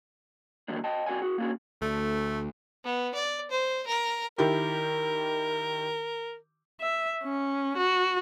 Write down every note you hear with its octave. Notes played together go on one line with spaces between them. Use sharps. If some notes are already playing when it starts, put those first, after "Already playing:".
D#3 E3 F#3 G3 A#3 D4
D#5 G5 A5
C4 F#4 D5 F#5 G#5
F#4 G#4
A#3 C#4 D4 F4 F#4 G#4
D2 A3
B3
D5
C5
A#4
D#3 E4 G4 A#4
E5
C#4
F#4